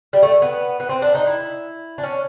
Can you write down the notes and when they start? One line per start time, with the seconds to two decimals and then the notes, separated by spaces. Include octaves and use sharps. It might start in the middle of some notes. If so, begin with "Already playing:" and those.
0.13 G3
0.23 A3
0.42 B3
0.80 B3
0.89 C4
1.02 D4
1.15 D#4
1.27 E4
1.98 D4
2.03 C#4